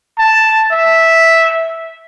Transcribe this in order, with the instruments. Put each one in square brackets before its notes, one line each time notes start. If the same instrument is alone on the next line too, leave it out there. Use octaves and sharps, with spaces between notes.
[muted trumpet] A5
E5